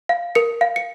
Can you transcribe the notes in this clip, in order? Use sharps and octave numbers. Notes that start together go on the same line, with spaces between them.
F5
A#4 C#7
F5
C#7